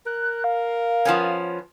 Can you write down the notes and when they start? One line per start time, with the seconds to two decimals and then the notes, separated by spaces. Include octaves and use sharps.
0.06 A#4 F#6
0.44 F5
1.05 F3 B3 C#4